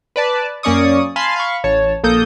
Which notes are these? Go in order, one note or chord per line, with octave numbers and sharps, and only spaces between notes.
B4 D5 A5
F#2 A#3 C#4 D5 C#6 D#6
F5 G#5 A5 B5 C6
F5 B5 C#6
A1 C#5 A5
A#1 A#3 A4 D#6 G6